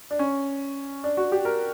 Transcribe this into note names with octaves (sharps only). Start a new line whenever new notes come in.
D4
C#4
D4
F#4
G4
A#4